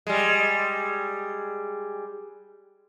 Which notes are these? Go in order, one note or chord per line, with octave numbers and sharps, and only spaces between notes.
G3 G#3